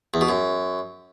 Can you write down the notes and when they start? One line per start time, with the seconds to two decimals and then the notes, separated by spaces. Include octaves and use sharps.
0.14 E2
0.21 B2
0.29 F#2